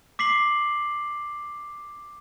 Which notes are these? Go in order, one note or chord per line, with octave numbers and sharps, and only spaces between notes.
D6 B6 C7 F#7